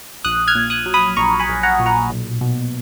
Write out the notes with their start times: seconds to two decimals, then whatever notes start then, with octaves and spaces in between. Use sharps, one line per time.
0.24 A#1 D#6 F#6
0.48 F6 G#6
0.55 A#2
0.70 D#6 F#6
0.86 F#3
0.94 B5 D#6
1.16 A#1 A#5 C#6
1.40 G#5 B5
1.48 A#1
1.63 F#5 A#5
1.79 A#2
1.86 F#5 A#5
2.10 B1
2.41 B2